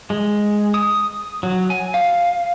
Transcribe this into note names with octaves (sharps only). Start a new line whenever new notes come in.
G#3
D#6
F#3
G#5
F5